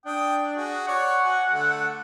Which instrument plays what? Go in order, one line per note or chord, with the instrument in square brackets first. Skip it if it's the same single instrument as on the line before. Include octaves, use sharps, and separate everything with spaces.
[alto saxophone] D4 [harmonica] G5 D#6
[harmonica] F#4 G#4
[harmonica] C#5 D5 [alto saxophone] F#5
[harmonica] F#4 G#5
D3 A3